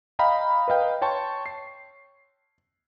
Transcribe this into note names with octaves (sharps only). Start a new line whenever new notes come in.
D#5 F5 G5 A#5 B5
B4 D#5 F5 G5
C#5 G5 A5 C6 C#6
C7